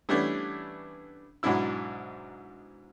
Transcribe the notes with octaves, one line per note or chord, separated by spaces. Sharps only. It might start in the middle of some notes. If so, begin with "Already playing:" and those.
E3 G3 A3 B3 C#4 D4
G#2 B2 F#3 D4 E4 E6